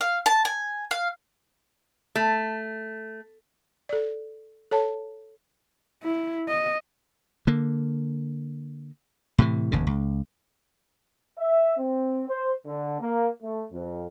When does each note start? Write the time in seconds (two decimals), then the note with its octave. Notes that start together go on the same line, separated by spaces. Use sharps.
0.01 F5
0.26 A5
0.45 G#5
0.91 F5
2.16 A3
3.89 A4 D5
4.71 A4 C#5 A5
6.03 E4
6.48 D#5
7.47 D3 A#3
9.38 A2 C3 E3
9.72 F1 D#2 C#3
9.87 C#2
11.38 E5
11.78 C4
12.29 C5
12.66 D3
13.01 A#3
13.43 A3
13.72 F2